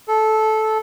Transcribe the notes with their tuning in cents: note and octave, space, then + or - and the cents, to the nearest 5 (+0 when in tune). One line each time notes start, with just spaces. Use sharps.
A4 -15